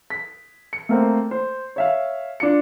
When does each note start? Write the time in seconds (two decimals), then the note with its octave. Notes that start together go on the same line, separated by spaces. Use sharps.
0.10 B6
0.73 C#7
0.89 A3 A#3 C4
1.31 C5
1.76 C#5 E5 F5
2.40 D4 F4 C#7